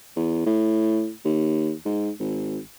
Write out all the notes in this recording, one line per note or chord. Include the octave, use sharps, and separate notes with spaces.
E2
A2
D#2
G#2
G#1